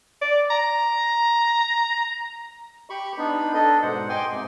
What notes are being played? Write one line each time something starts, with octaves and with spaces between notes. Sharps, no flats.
D5
A#5
G4 B5 C#6
B3 D4 D#4 B5
D4 A4 D#5
G#2 B2 C5 F#5
D#5 G5 G#5 C6 D6
G#2 C3